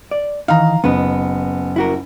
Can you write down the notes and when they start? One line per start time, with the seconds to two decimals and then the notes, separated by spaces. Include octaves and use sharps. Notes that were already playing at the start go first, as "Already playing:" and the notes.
0.11 D5
0.48 D#3 E3 D#4 F5 A#5
0.84 F#1 B3 D#4 B4
1.76 E4 F#4 A#4